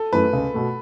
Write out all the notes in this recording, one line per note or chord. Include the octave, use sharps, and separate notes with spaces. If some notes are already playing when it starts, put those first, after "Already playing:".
Already playing: A4
F#2 E3 A3 B4
C#2
B2 A3